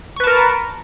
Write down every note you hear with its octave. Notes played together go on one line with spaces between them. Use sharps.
A#4 B4 A5 C#6